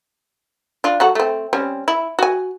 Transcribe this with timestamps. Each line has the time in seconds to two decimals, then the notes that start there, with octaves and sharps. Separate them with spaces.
0.84 D4 F4
1.00 F#3 F#4 A4
1.15 A3 C4
1.53 G3 C4 C#4
1.88 E4
2.19 F#4 G#5